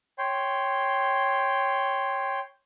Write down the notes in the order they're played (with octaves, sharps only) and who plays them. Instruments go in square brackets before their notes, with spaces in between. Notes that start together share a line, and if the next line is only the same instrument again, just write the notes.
[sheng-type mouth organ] C#5 G5 C6